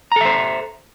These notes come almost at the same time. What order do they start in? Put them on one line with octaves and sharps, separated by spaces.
A#5 A4 E5 C5